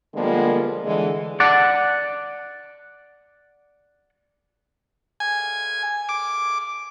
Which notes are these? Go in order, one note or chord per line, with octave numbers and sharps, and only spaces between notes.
D3 F3 G3 G#3 A#3 B3
D3 E3 G#3
D5 F#5
G#5
D6